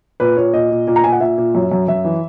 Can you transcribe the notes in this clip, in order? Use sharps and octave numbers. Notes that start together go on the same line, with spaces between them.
A#2 B4
A#2 C#5
A#2 D#5
A#2
A#2
A#5
A#2 G#5
F#5
A#2 E5
A#2
F#2
F#2
F#2 E5
E3